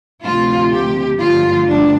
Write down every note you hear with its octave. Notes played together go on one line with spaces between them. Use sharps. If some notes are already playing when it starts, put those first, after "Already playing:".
D2 C3 F3 A3 F4
G4
G2 D3 F3 A3 F4
D4